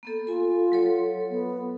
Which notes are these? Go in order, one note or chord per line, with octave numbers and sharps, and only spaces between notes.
A#3 B3 A4
F4 A4 G#5
F#3 A4 C#5
B3